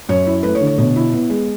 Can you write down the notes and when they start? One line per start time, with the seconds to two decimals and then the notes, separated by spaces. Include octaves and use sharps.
0.09 F#2 C#5
0.27 E4
0.43 A3 B4
0.55 C#5
0.61 D3
0.67 C#5
0.78 B2 C#5
0.96 E4
1.13 B3
1.30 G#3